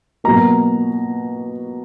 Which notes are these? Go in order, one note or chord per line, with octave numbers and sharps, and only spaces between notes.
B2 F#3 A#3 A#5